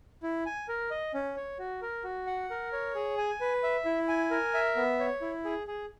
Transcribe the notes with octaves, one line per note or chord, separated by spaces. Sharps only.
E4
G#5
A#4
D#5
C#4
C#5
F#4
A#4
F#4
F#5
A#4
C#5
G#4
G#5
B4
E5
E4
G#5
A#4
E5
B3
C#5
E4
G#4
G#4